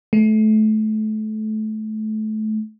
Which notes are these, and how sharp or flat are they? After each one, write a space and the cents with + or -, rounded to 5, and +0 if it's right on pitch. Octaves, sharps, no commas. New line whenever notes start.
A3 -25